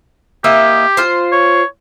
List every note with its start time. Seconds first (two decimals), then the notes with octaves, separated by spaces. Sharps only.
0.44 A#3 E4 G4 D#5
0.97 F4 C5
1.32 C#5